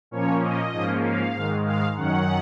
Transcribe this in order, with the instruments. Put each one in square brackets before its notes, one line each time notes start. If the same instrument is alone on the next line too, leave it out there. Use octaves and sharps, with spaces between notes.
[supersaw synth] A#2 F3 A#3 C#4 C#5
D#5
G#2 F3 A#3 C#4
F5
G#2 D#3 G#3
F5
F#2 D#3 F#3 C#4 F#5